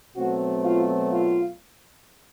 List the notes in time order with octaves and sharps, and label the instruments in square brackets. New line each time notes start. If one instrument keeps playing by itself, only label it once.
[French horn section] B2 F#3 A3 C4 F#4
F4
F4